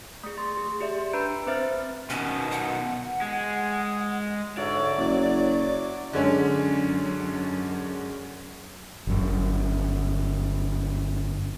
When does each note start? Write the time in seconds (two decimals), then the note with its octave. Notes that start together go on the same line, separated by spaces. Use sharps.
0.24 A3 G#4
0.38 C6 A6
0.57 G#4
0.81 G4 D5 E5
1.13 D4 B4 A#5 B5 D7
1.47 C4 B4 C5 E5 F6 A6
2.10 B2 D#3 C#4
2.51 F#5
3.22 G#3
4.57 G#2 D3 F#4 C#5 D5 E5
4.98 F#1 F#3 D6
6.13 F#2 D3 G#3 C#4
9.07 G1 F#2